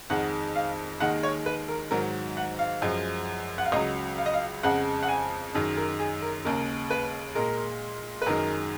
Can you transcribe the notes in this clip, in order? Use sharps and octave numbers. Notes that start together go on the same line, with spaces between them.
F2 D#3 G#3 F#5
F5
D#2 D#3 G#3 F#5
C#5
B4
A#4
G#2 D#3 F#3 A#4
F#5
F5
F#2 F3 G#3
F#5
F5
C#2 C#3 F#3 D#5
F5
D#5
F5
F2 C#3 G#3 F#5
F#5
G#5
F#2 D#3 G#3
A#4
G#4
A#4
D#2 C#3 G#3 A#4
B4
A#2 G#3 A#4
B4
F#2 D#3 G#3 A#4